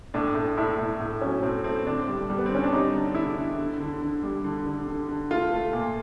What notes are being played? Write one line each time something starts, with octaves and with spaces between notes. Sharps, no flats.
A2 D4
A2
A2 E4
A2
A2
F#3 C#4
A2 C4
A3 C4
D3 D4
G3
G3
B3
C4
D3 C#4
D4
G3 D#4
D3
D3 E4
D3
D3
D3
D3
G3
D3
D3
D3
D3
A3 F4
A3
A#2